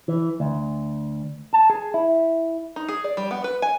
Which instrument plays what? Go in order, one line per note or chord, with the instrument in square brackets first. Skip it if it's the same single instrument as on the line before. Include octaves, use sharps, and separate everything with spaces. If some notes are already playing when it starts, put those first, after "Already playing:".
[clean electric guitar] E3
D2
A5
G#4
E4
[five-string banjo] D#4
G#4
D5
G3
B3
B4
G#5